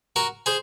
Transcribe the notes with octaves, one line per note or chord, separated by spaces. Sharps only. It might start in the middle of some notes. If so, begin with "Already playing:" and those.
F#4 A#4
G#4 C5